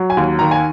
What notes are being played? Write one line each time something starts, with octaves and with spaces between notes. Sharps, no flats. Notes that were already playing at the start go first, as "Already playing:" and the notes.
Already playing: F#3
G#5
D#2
D#3 A#5
G#5